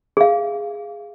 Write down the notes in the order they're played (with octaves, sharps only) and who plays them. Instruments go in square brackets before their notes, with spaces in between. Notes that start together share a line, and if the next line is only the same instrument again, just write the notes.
[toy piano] G#4 F5